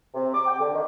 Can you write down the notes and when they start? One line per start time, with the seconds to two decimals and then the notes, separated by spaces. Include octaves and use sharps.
0.14 C3
0.33 D6
0.45 G5
0.59 D3
0.74 D#3